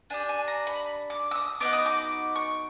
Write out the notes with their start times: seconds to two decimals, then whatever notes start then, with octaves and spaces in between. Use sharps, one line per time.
0.10 D4 G4 G#5
0.29 G#5
0.48 A#5
0.67 B5
1.10 D6
1.31 E6
1.36 D#6
1.60 B3 D#4 F#4 D6
1.73 D#6
1.86 D6
2.36 C#6